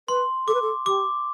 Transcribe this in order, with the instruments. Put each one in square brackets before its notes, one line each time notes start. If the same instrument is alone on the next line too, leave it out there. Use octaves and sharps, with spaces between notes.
[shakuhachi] B4 [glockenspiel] C6
[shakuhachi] A4 [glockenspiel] D6
[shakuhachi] B4
A4
[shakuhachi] G4 [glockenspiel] D6